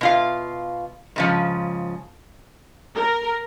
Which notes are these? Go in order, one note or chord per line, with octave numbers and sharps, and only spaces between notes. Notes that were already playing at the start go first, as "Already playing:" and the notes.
B2 F4 F5
G#2 C#3 F3
A#4